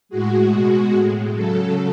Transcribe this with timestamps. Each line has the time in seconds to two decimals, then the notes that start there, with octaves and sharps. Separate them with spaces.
0.09 A2 G#3 F#4
0.50 B2 G#3
0.92 A2 G#3
1.33 C#3 F#3 A4